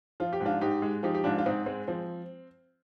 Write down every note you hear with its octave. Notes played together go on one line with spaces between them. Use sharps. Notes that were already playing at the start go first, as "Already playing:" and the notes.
F3 F4
G4
G#2
D4 F4
G#2 D#4 G4
G#3
F3 D#4 G4
G4
G#2 D4 F4
F4
G#2 C4 D#4
G#3 C4
F3 C4